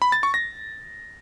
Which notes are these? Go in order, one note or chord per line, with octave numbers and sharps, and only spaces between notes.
B5
A6
C#6
A#6